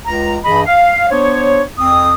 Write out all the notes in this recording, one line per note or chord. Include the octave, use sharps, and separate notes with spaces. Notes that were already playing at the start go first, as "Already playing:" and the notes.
C#2 A#5
G2 E3 G#4 D#5 B5
F5
B3 D4 C5 C#5
F2 C4 D#6